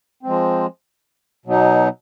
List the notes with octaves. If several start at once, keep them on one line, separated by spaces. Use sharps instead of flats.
F3 G#3 C4
B2 F#3 B3 D#4